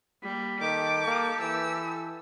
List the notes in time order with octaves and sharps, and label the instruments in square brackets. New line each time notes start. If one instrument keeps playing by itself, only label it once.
[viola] G3 A#3 [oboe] B5
[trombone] D#3 [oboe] G4 [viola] A4 [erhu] D6
[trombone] A#3
[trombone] E3 [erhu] E6